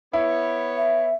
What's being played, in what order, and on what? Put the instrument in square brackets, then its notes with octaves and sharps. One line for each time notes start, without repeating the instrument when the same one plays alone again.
[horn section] B3 C#5 [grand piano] E4
[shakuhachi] E5